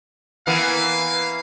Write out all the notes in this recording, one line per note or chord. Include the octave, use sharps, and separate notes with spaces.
E3 A#3 B3 F5